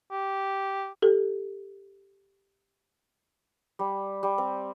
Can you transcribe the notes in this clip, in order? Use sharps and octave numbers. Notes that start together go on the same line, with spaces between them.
G4
G4 A4
G3
G3
C4